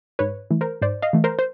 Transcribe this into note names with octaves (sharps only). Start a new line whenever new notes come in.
G#2 B4 C#5
E3 A3
A#4 C5
G#2 C5 D5
D#5 F5
E3 A3
A#4 C5
C5